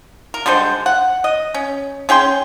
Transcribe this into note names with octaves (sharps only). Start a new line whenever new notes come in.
A#4
D3 G3 G#3 C5
F#5
D#5
C#4
C#4 G#4 G5 C6